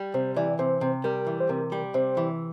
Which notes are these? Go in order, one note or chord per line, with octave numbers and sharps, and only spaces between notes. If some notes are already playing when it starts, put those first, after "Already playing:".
Already playing: G3
C3 C5
E3 D5
C3 C5
C3
G3 A#4
E3
C5
C3 A#4
G3
C3 C5
E3